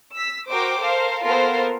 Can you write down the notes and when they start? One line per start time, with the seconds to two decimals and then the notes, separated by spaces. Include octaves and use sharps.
0.14 E6 B6
0.50 F#4 A#4 C5 G5 D6
0.79 A4 A#4 C5 F5
1.25 A#3 B3 F4 A4 A#4 C5